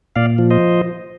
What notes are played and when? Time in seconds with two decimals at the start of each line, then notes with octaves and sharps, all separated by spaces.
0.16 A#2 D5 F5
0.38 F3
0.50 C5 D#5